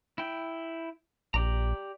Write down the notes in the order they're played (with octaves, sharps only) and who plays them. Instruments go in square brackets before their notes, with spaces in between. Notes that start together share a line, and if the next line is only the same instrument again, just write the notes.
[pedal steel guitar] E4 G5
[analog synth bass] A#1 [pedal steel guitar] G4 D5 A#5